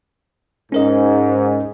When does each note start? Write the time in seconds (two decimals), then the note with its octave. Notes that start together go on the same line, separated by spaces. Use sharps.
0.72 G#2 C#4 A#4 D#5